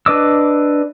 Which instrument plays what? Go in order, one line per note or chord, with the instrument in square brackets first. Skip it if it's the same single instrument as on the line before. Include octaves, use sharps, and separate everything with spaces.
[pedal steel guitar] D4 B4 D#5 D6 E6